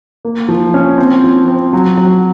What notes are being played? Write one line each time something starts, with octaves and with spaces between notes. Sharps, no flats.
A#3
F3
C#4
C4
F3
C4
F#3
F#3